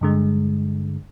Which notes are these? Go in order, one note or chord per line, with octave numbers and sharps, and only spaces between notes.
G2 D3 G#3